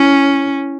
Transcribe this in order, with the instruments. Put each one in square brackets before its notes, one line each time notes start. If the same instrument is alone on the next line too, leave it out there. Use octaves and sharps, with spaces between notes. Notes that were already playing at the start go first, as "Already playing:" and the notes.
Already playing: [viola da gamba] C#4 [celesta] E4